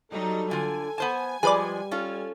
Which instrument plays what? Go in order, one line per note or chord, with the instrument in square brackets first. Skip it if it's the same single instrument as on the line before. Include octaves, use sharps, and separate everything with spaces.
[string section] F#3 G3 D#4 [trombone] A4
[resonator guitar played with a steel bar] D3 F4 [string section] G#5
[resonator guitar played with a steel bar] B3 C5 A5
[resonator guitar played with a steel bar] F3 G#3 [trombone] G3 [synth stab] G#4 B4 D5
[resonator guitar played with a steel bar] C#4 F4 A4